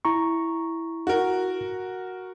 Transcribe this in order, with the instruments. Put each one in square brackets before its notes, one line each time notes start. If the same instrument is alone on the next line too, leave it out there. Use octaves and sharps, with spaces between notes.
[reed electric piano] E4 A#5 C#6
[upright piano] F#4 A#4